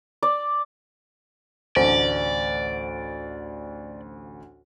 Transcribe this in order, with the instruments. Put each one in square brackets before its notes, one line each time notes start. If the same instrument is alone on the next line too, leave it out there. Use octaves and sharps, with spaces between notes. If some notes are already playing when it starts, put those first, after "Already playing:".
[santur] D5
[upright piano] A1 D2 [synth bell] C5 [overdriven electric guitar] D5